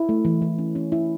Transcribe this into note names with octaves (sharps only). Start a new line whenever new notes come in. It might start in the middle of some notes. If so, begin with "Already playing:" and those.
Already playing: E4
A3
E3
E3
C#4
C#4
E4